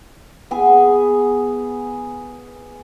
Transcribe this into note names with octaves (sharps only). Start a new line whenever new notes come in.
B3 G#4 G#5